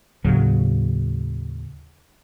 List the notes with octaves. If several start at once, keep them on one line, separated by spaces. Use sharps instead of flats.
D#2 A2 C#3 F#3